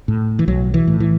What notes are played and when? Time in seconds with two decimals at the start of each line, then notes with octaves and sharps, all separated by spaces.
0.08 A2
0.39 E3
0.48 B1 F#3
0.74 E3
0.88 A2
1.00 E3